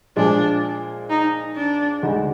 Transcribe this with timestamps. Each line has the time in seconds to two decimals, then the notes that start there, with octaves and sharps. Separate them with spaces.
0.16 A#2 F3 G#3 D4
1.10 D#4
1.56 D4
2.03 D2 D3 G#3 D#4 F#4